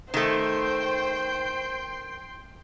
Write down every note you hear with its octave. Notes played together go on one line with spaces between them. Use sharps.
D#3 A3 C5 G5 C6